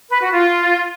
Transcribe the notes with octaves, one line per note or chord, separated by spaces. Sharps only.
B4
F#4
F4